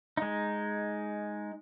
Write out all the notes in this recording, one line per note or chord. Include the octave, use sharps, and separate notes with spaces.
G#3 D#4